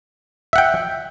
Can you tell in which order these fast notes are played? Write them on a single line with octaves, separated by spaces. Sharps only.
E5 F#5 G5